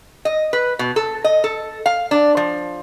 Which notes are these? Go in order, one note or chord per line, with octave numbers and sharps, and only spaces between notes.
D#5
B4
B2
A4
D#5
A4
F5
D4
F3